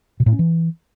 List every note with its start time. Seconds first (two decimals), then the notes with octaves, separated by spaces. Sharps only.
0.20 B2
0.26 A2
0.33 C#4
0.39 E3